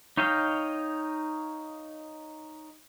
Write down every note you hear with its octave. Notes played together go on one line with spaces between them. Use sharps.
D#4 C#5 D#5 F5 G5